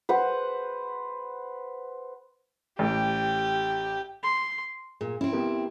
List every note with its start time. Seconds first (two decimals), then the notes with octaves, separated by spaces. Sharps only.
0.09 B4 C5 F#5
2.79 A1 G4
4.23 C6
5.01 A#2 G#4
5.21 C4 C#4 E4
5.33 B3 G4 A#4